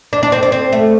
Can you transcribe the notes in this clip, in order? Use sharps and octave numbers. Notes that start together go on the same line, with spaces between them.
D4
D4
C4
D4
C4
A3